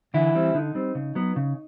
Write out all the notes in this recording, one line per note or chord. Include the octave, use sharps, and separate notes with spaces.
D3 E3 E4
G3 C4
D3 D#4
G3 C4
C#3
F#3 B3
C#3